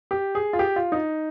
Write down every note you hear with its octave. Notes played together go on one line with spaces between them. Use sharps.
G4
G#4
F4
G4
F4
D#4